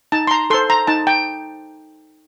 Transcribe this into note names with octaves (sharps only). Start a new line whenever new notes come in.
D#4 A5
C6
A#5
A4 C5 C6
A#5
D#4 A5
G5